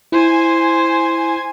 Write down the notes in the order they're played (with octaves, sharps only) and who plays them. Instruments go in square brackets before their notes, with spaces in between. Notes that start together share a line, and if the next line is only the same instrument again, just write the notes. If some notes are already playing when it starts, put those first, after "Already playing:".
[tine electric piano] E4 [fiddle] C5 [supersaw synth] G#5 G#6